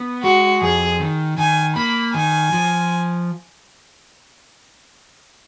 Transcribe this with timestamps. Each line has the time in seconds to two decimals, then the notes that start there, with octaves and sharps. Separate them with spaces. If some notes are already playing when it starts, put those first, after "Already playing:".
Already playing: B3
0.23 G#3 F#4
0.62 F2 G#4
1.00 D#3
1.38 D#3 G#5
1.76 A#3 B5
2.14 D#3 G#5
2.52 F3